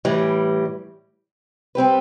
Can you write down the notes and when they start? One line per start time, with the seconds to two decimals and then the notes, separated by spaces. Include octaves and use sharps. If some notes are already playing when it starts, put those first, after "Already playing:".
0.05 A2 E3 G3
1.75 G3 C4 G4 B4